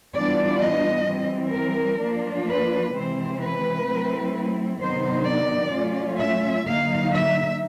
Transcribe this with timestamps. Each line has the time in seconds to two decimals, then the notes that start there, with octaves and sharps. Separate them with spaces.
0.15 E3 G3 B3 D4 F4 D5
0.61 D#5
1.08 E3 G3 C4
1.55 A#4
2.01 F3 A#3 D4 F4
2.48 B4
2.94 C3 E3 G#3 C4 C5
3.41 B4
3.87 F#3 A3 C4 E4
4.80 C3 D#3 F#3 B3 D#4 C5
5.26 D5
5.73 F#3 A3 C#4 F4
6.19 E5
6.66 D3 F#3 A#3 D#4 F5
7.13 E5